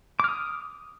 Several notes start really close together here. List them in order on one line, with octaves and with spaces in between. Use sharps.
D6 F6 D#6